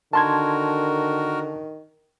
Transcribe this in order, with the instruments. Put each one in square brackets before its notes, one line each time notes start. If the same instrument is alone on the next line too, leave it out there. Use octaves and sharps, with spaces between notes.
[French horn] D3 [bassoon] D#3 [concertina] F#4 A#4 [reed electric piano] A5 C6 G#6